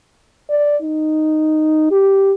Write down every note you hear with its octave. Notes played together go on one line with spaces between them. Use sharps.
D5
D#4
G4